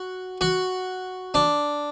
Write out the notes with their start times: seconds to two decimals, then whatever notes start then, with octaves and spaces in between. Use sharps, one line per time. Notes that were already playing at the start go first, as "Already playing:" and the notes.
Already playing: F#4
0.41 F#4
1.34 D4